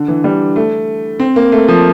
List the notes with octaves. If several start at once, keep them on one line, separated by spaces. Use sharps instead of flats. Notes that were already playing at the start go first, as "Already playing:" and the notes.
Already playing: D3
E3
G3
A3
C4
A#3
A3
F3